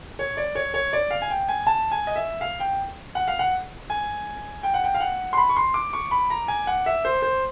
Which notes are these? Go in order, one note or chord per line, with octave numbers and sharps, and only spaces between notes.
C#5
D5
C#5
C#5
D5
F5
G#5
G5
G#5
A5
G#5
D#5
E5
F5
G5
F#5
F5
F#5
G#5
G5
F#5
G5
F5
F#5
C6
B5
C#6
C6
D6
C#6
B5
A#5
G#5
F#5
E5
C5
C5